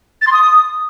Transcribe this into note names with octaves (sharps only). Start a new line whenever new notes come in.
A6
C6
D#6